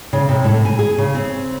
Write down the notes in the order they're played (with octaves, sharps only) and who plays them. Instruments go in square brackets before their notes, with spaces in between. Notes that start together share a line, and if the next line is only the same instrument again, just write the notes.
[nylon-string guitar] C#3
C3
A2
G#5
G#4
C#3
C4